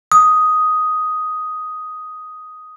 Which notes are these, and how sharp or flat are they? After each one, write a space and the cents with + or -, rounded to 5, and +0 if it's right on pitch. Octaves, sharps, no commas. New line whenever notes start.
D#6 +5